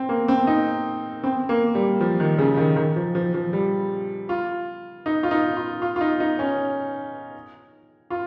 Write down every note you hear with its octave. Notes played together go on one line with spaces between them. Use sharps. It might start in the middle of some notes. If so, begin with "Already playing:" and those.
Already playing: C4
A#3
C4
D#4
C4
A#3
G3
F3
D#3
C#3
D#3
D#3
F3
F3
F3
G3
F4
D#4
F4
D#4
F4
F4
F4
D#4
D#4
C#4
F4